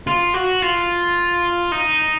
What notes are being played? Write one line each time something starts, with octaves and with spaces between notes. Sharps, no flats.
F4
F#4
F4
D#4